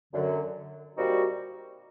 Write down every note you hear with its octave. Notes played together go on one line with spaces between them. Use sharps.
F#2 D3 F#3
A#2 G3 C4 D#4 F#4